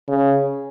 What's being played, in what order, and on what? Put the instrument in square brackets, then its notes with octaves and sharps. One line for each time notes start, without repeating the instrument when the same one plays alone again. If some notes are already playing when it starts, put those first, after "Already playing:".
[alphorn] C#3